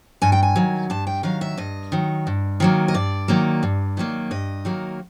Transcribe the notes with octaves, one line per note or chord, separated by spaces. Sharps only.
G2 G#5
G5
G#5
D#3 F#3
G2 A5
G5
D#3 F#3 F5
E5
G2 D#5
D#3 F#3
G2
D#3 F#3 A#3
D#5
G2 D5
D#3 F#3 A#3
G2
D#3 F#3 A#3
G2 D#5
D#3 F#3 A#3